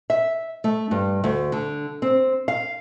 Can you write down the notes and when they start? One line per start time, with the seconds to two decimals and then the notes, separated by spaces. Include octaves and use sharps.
0.10 E5
0.64 A3
0.91 G2
1.24 D2
1.52 D3
2.02 C4
2.48 F5